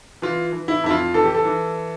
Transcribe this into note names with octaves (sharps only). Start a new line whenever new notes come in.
E3 F4
E3
E4
F2 E4
F4
E3 A4
G4
A4
E3